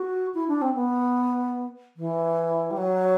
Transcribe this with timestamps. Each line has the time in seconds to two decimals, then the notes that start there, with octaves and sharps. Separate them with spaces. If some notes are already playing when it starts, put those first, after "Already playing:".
Already playing: F#4
0.34 E4
0.48 D4
0.62 C4
0.75 B3
1.97 E3
2.71 G3
2.77 F#3